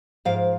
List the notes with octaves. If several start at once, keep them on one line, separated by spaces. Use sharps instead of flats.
G#2 F3 F5